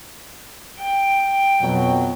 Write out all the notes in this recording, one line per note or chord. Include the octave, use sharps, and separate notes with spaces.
G5
F2 B2 F#3